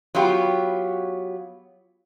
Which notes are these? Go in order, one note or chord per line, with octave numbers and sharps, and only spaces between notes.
F#3 B3 F4 G4